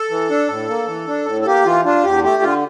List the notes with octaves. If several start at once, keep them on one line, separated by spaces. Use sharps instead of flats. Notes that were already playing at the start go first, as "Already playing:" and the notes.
Already playing: A4
E3
D4
A2
A#3
E3
D4
A2
A4
A#3 G4
E3 F4
D4 F4
E2 G4
A3 G4
D3 F4